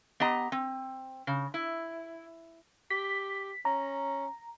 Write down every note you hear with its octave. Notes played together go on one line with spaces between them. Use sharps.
B3 G4 D#5 A#5
C4
C#3
E4
G4 B6
C#4 A#5